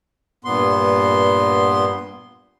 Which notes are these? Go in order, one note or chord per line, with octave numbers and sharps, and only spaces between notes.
G2 A#2 B3 C6